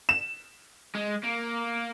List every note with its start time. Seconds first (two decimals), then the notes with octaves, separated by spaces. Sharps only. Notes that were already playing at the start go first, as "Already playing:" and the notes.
0.09 E7
0.95 G#3
1.24 A#3